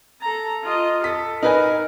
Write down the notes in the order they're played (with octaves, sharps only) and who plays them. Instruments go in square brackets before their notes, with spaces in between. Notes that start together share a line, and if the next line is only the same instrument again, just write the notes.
[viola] A4 A#5
F4 D#5
[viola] A4 [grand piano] B6
[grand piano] D#4 B4 G#5 [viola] A#4